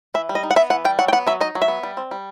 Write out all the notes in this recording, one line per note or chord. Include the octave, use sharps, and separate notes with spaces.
E3 E5
G3
D#5
D#4
F#5
B3 E5
E3 F#5
G3 G5
F#3 F#5
G5
B3 F#5
F#3 E5
D#4 D#5
F#3
E5
B3
G3
C4
G3